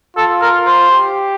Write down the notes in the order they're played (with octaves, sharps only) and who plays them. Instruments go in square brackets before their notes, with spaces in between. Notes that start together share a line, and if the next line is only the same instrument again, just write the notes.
[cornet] F4 [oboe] A4
[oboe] A#4
C5
[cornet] G4